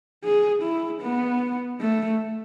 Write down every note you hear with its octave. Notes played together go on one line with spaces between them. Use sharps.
G#4
E4
B3
A3